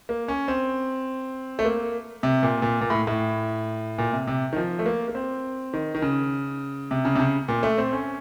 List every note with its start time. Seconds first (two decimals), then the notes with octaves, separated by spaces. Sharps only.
0.09 A#3
0.28 C#4
0.48 C4
1.59 A3
1.64 A#3
2.23 C3
2.43 A#2
2.62 A#2
2.81 A#2
2.90 A2
3.07 A2
3.98 A#2
4.13 C3
4.27 C3
4.53 D#3
4.56 F3
4.79 A3
4.86 A#3
5.08 A#3
5.15 C4
5.74 D#3
5.95 D#3
6.02 C#3
6.91 C3
7.05 C#3
7.15 C3
7.19 C#3
7.48 A#2
7.63 A3
7.78 C4
7.93 C#4